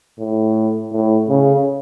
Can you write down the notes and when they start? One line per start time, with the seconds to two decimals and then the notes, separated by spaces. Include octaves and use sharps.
0.19 A2
0.92 A2
1.29 C#3